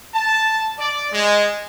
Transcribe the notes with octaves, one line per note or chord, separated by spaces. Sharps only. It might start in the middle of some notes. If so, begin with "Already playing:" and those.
A5
D5
G#3